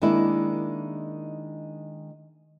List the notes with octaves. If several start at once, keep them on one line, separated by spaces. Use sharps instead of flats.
D#3 G#3 A#3 D4 E4